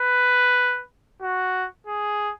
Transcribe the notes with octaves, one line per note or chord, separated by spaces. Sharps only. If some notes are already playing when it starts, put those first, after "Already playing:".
Already playing: B4
F#4
G#4